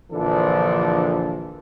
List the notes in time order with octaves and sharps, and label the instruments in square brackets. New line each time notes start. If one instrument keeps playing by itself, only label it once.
[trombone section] A#1 D3 E3 F3 D4 A4